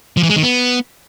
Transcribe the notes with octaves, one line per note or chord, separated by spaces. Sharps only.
F3
E3
G#3
D#3
B3